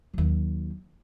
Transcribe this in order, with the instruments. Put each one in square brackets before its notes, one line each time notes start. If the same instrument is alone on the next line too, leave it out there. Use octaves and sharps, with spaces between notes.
[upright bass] D#2 F#3